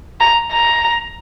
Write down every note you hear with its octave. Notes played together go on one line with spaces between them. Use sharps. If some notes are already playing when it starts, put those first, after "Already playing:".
A#5
A#5